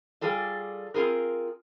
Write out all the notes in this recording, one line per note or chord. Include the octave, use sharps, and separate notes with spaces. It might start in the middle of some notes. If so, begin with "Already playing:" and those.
G3 F4 G#4 A4 D5
C4 F4 G#4 A#4